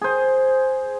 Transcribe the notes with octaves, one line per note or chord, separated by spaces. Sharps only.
G#4 C5